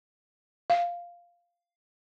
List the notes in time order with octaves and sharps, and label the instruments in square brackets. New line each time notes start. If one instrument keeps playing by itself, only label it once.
[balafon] F5